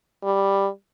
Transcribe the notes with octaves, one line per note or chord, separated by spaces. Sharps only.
G3